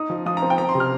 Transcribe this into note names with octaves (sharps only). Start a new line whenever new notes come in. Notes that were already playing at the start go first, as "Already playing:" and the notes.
Already playing: D#4 D#6
F3
F3 D#6
A#5
C4
G5
C4 A#5
C6
C3
F6